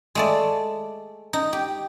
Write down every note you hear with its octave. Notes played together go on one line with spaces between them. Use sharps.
G#3 A3 D5
D#4
G4